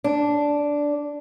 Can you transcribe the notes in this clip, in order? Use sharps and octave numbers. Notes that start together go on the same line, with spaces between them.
D4